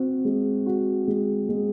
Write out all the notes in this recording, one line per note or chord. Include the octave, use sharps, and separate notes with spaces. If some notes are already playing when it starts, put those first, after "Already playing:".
Already playing: C4 F#4
G#3
F#4
G#3
G#3